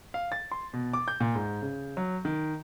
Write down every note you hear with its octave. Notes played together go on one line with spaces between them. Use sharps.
F5
A6
C6
B2
D6
G6
A#2
G#2
C#3
F#3
D#3